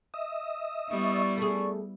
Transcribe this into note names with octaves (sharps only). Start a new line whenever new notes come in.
D#5 E5 D#6
G3 B3 E4 D5 C#6
A3 G#4